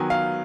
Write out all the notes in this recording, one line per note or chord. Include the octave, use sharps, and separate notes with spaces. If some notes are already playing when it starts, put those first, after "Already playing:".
Already playing: D#3 F#3 B3 G#5
F5